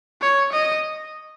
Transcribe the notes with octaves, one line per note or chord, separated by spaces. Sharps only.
C#5
D#5